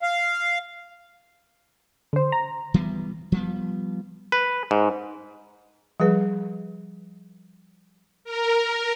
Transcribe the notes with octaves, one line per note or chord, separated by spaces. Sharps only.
F5
D3 C5
A#5
E3 G3 B3
F3 G3 B3
B4
G#2
F3 G3 G#4 B4
A#4